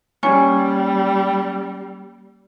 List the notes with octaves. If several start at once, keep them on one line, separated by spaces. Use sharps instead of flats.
G3 A#3 C#4 C#5 G#5 C#6